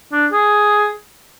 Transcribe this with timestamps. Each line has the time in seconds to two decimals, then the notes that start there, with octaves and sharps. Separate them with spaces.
0.12 D4
0.32 G#4